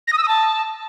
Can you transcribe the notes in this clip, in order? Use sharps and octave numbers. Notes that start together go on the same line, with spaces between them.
A#6
D#6
E6
D#6
A5